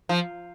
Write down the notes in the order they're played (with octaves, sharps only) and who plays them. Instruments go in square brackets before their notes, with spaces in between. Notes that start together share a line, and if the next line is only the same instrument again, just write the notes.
[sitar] F3